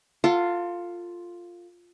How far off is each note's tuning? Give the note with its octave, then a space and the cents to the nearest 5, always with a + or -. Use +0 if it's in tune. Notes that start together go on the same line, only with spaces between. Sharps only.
F4 +0 A4 +30 F#5 -10